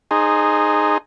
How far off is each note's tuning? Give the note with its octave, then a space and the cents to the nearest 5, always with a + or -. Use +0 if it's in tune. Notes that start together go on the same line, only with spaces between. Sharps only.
D#4 -15 G#4 +0 C5 +0